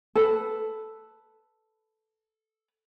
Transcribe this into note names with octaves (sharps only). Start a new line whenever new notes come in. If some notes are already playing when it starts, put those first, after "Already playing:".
A4 B4